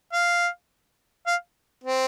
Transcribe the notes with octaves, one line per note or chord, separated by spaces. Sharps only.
F5
F5
C4